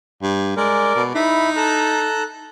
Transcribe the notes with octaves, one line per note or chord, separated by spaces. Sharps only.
G2
G#3 A#4 D5
B2
D#4 E4 B5
A4 A#5 F#6